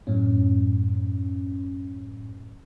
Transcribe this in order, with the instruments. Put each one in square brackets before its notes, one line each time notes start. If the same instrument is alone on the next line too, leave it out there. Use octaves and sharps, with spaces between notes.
[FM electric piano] F#2 A2 C#4